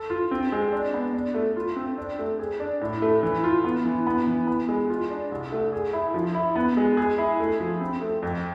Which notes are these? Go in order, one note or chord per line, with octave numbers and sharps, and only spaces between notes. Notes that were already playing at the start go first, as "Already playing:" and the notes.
Already playing: A4
F4
C4
G#3
D4
B3
D4
A3
F4
C4
D4
A3
G#4
D4
A2
A3
E3
F4
B3
E3
B3
E3
B3
G#3
F4
D4
C2
A3
G#4
E4
F3
E4
B3
G#3
G#4
E4
A3
F3
C4
A3
F2